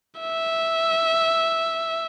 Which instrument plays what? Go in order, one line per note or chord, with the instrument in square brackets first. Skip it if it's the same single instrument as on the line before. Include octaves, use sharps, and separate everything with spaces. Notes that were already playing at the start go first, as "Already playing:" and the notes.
[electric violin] E5